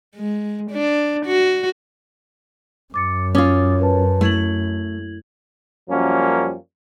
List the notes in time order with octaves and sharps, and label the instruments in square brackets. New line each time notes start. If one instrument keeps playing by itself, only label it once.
[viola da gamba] G#3
D4
F#4
[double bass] F#2 [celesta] D6 A6 C#7
[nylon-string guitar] C#4 F4 [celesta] D6 D#6 A6
[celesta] A#4 B4 A5
[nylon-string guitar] A3 [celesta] E4 G#6 F#7
[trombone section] F#2 F3 G3 A#3 C#4